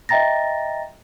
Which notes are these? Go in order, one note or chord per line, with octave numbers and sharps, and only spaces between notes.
D#5 E5 G5 A#5 A6 A#6